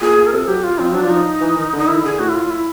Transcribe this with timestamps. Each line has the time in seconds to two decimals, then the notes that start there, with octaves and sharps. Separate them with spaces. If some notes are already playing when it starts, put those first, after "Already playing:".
0.01 A#2 G#4
0.17 A#2
0.27 A#4
0.32 C3 A4
0.47 F#3 G4
0.64 F4
0.79 F3 C4
0.92 F#3 D4
1.05 F3
1.10 D#4
1.41 E3
1.57 D#3
1.73 D3
1.78 D#4
1.88 D#3 E4
2.03 D3 G#4
2.19 A2 F#4
2.29 E4
2.35 F4
2.50 E4